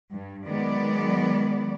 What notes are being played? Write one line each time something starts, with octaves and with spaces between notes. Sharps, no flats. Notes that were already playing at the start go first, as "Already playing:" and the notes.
G2
D#3 F#3 G#3 B3 D5